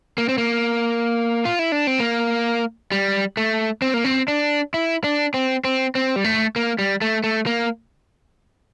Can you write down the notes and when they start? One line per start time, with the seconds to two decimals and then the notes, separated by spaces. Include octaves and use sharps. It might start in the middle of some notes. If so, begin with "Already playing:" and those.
0.18 A#3
0.29 C4
0.38 A#3
1.45 F4
1.59 E4
1.72 D4
1.87 C4
2.00 A#3
2.92 G3
3.37 A3
3.82 C4
3.94 A#3
4.04 C4
4.28 D4
4.74 E4
5.04 D4
5.34 C4
5.64 C4
5.95 C4
6.16 G3
6.24 A3
6.56 A#3
6.79 G3
7.01 A3
7.24 A3
7.46 A#3